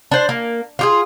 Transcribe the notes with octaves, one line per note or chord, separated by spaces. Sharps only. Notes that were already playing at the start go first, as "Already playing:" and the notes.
D4 C5
A#3
F4 G4 G#4